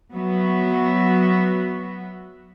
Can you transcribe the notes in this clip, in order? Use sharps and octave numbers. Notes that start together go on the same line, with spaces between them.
F#3 B3 F#4 E5